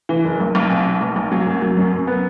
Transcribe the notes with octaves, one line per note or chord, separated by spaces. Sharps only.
E3
F#1
B1
B1
B2
B2
B1
B1
F#3
F#2
F#3
F#2
F#2
B3